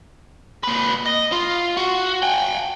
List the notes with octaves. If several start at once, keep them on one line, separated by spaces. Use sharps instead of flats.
A#2 B4
D#5
F4
F#4
G5 G#5